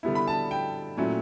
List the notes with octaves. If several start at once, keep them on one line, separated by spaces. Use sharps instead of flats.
D3 G3 B3 E4
B5
A5
G5
A#2 F#3 A3 C#4 E4